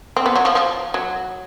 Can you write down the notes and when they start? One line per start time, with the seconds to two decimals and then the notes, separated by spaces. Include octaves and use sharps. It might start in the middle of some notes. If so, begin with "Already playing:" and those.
0.16 C4
0.26 B3
0.36 F#3
0.45 F3
0.55 F3
0.94 F#3